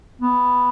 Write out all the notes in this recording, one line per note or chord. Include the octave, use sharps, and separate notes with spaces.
B3